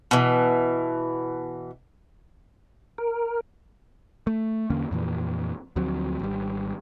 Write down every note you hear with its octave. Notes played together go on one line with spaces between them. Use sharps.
B2 E3
A#4
A3
E2 D3 A#3 C#4
F2 A#2 E3
D2 F3 F#3 C4
G#1 G3